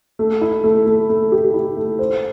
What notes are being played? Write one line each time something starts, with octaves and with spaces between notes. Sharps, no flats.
A3
E4
A3
A3
A3
G4
E4
A3
C5